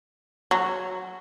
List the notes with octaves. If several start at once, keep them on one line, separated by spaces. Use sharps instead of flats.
F#3